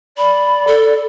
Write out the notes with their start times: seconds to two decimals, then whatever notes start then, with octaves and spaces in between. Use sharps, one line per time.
0.18 D5 B5
0.67 A4